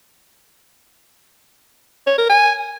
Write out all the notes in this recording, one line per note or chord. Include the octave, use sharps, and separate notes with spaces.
C#5
A#4
G#5